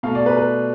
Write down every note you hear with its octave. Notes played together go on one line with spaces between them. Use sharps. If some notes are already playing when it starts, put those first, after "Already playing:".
B2 A3 F5
D5
B4
B4